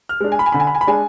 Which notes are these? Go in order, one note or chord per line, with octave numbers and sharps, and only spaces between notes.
F6
G#3 D4
G#5
B5
G#5
D3 B5
G#5
B5
G#5
B5
G#3 D4 G#5